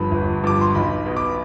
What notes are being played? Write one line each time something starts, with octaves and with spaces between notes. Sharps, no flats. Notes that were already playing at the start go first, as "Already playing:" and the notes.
Already playing: G1 G2 F3 B5
G1
G2 F3 D6
C6
B1 B5
B2
D6